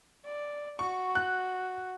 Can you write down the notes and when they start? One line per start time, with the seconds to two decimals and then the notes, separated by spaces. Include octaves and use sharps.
0.25 D5
0.79 F#4 C#6
1.15 F#6